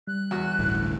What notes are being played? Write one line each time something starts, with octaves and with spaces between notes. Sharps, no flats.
G3 F#6
E2 F#4
G1 D2 A2